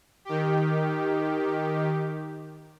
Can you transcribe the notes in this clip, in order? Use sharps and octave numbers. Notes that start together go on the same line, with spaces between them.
D#3 G4